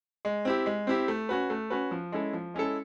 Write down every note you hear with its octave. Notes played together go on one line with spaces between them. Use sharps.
G#3
C4 E4 G4
G#3
C4 E4 G4
A3
C#4 F#4 B4
A3
C#4 F#4 B4
F3
G#3 C#4 E4 A4
F3
G#3 C#4 E4 A4